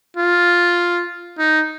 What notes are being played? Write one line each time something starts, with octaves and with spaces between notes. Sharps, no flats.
F4
D#4